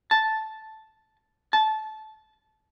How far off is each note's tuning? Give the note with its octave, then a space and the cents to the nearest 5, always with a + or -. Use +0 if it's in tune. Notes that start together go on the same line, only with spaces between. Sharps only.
A5 -5
A5 -20